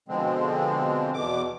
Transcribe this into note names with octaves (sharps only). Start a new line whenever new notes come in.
B2 D3 F3 G#3 C4
E2 B2 D6